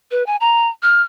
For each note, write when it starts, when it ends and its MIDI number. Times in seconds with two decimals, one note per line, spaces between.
0.11 0.25 71
0.26 0.36 80
0.40 0.68 82
0.83 1.02 89